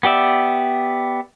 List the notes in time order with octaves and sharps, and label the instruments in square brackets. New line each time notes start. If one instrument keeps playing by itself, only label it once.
[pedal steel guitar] B3 G4 D5 E5